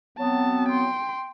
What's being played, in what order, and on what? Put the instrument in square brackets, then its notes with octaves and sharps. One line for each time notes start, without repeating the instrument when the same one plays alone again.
[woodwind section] F#3 B3 C4 [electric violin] A5
[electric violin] G5 C6